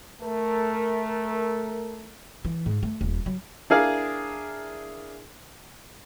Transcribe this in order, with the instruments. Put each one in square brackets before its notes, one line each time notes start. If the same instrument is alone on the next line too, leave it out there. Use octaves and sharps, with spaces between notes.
[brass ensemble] A3 A#4
[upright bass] E3
G#2
A3
D#1
F#3
[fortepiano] D4 E4 G#4 A#4 F5 G#5